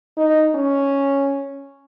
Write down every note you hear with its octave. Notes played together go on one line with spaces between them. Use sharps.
D#4
C#4